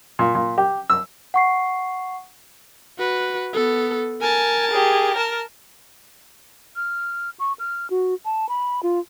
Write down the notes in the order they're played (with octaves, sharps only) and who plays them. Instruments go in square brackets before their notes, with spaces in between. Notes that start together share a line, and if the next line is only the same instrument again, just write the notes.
[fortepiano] A#2
A#2
G4
E6
[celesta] F#5 C#6 C7
[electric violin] F#4 B4
B3 A4
[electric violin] A#4 A5 [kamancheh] G#5
[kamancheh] G4 G#4
A#4 A5
[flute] F6
C#6
F6
F#4
A5
B5
F4